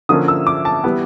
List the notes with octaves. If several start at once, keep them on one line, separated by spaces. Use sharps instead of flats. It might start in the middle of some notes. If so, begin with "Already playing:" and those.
D3 F3 A#3 C#4 D#6
E6
D6
A5
E3 G3 B3